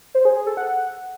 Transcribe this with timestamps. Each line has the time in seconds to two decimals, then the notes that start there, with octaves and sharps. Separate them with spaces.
0.15 C5
0.25 G#4
0.36 G#4
0.47 A4
0.57 F#5